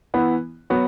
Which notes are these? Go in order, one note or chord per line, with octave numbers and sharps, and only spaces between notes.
E3 B3 E4
F#3 B3 F#4